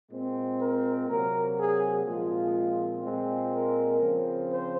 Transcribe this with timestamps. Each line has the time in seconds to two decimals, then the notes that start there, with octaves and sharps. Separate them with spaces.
0.11 A#2 G#3 C4
0.59 A#4
1.08 C3 F#3 A#3 A#4
1.57 G#4
2.05 A#2 F3 G#3 C4 F4
3.03 A#2 G#3 C4
3.51 A#4
4.00 C#3 F3 C4
4.49 C5